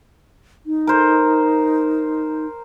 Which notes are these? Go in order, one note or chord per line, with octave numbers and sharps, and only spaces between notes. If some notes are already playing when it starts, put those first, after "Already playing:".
D#4
A#4 C5